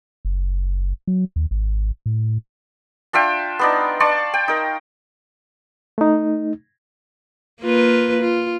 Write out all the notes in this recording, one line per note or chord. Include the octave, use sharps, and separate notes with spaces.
F#1
F#3
D#2
G#1
A2
D4 F4 E5 G5
B3 D4 D#4
D5 A5 C6 C#6
G5
D#4 A#4
A3 D#4
A#3 F4 B4
F4